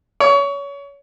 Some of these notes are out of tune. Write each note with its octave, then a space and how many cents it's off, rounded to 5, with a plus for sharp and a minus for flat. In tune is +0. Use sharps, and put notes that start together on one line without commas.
C#5 +25